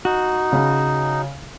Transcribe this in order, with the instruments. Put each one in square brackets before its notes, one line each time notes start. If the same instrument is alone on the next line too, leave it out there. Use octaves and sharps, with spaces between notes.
[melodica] D#4 [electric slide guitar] F#4
[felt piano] C#3